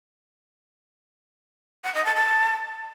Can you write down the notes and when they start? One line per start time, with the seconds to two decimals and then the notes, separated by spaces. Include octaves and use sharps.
1.84 F#5
1.94 D#5
2.05 A5
2.15 A5